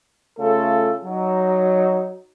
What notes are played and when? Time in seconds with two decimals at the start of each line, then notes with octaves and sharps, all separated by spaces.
0.38 C#3 A3 F4 A4
1.05 F#3 D#4